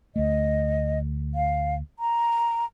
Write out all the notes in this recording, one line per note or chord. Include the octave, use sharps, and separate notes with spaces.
D2 A3 D#5
F5
A#5